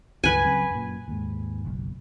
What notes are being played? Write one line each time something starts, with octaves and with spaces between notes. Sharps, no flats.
C#2 G2 F#3 B4 G#5
C#3 F#3 C4
F#2 A#2
D#2 G#2
F#1 B1